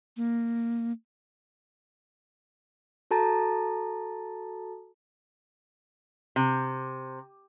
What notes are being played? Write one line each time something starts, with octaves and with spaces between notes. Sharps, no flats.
A#3
F#4 A4 A5 A#5 A6
C3